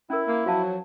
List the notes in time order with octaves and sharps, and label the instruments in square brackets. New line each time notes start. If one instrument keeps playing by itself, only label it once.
[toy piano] C#4 A#4 [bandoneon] E4
[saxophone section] A#3
[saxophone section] F3 F#3 [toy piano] F#4 F5 A5